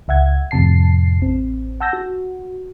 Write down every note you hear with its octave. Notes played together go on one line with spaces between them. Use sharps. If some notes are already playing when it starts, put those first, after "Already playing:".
C#2 E5 F#5 G#6
F2 A2 C3 A5 C7
A1 C4
F#5 A5 E6 G6 A#6
F#4